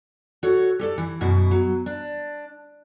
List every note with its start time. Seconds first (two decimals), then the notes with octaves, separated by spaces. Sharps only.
0.43 F#4 A4 C#5
0.79 G4 A4 D5
0.98 E3
1.21 F#2 B2 E4
1.51 F#3
1.86 D4